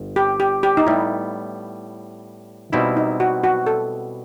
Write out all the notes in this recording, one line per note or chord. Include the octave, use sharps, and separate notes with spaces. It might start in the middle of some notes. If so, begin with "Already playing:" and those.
Already playing: G1
G4
G4
G4
D#4
A2 G3 B3 E4
B2 G3 C4 D#4 E4
D#4
F#4
F#4
A4